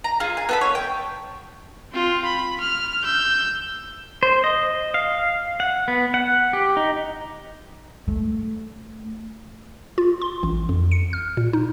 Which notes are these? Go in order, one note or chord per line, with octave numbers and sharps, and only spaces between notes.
A#5
F4 G#4
G#5
B3 A4 B5
C#5
G5
C4 F4
B5
F6
E6 G6
C5
D#5
F5
F#5
B3
F#5
G4
D#4
A3
F4
C6
A1
F2
C#7
F6
A#2
D#4